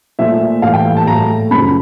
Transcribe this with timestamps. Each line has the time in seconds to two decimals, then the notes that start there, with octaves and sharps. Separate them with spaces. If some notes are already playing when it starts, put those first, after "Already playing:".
0.19 A#2 F3 A3 E5
0.62 A2 E3 G3 F5
0.74 G5
0.96 A5
1.07 A2 F#3 A3 A#5
1.51 F#2 B5
1.54 C#3 F3